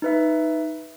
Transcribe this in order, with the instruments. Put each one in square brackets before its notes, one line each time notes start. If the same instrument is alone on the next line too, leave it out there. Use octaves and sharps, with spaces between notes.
[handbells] D#4 B4 E5